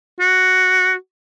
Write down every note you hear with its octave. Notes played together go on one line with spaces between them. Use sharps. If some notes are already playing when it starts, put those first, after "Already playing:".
F#4